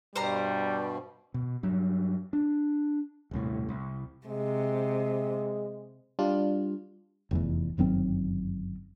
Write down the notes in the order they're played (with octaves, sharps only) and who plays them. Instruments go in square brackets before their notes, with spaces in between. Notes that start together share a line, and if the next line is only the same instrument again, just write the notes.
[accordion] G2 B2 [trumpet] G3 [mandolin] C5 A#5
[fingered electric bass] B2
G2 F#3
D4
D#1 C2 A2
C2
[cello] C3 [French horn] G#3
[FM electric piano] G3 D4 F4
[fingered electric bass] F1 E2 E3
G1 F#2 D#3 C4